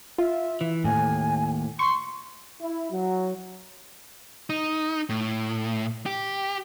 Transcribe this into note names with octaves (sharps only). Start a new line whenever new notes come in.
F4 E5
E3
D#2 A2 G#5
C6 C#6
E4
F#3
D#4
A2
G4